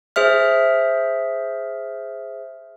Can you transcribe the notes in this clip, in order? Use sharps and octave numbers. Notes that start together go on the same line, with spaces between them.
G#4 C5 E5 F6